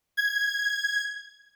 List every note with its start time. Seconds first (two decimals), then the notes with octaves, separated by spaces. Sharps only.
0.17 G#6